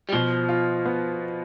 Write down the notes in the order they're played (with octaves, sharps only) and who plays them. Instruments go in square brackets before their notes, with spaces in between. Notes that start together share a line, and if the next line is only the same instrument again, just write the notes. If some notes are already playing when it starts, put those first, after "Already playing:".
[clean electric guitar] G3
[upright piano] B2 [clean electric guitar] F3
[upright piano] F4
B3